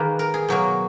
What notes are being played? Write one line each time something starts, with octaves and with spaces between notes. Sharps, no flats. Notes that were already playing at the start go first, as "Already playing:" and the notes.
Already playing: D#3 A#3 G#4 B4
A#4
G#4
B2 F#3 A#3